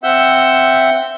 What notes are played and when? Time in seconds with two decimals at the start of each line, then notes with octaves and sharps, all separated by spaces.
0.04 C4 E5 F#5 E6 G6